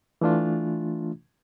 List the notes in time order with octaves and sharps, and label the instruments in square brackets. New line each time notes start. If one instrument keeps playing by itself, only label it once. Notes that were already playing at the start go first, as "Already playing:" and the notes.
[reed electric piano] E3 A3 D4 F4